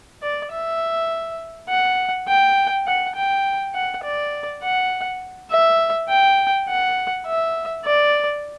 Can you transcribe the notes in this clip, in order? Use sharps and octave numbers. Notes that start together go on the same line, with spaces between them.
D5
E5
F#5
G5
F#5
G5
F#5
D5
F#5
E5
G5
F#5
E5
D5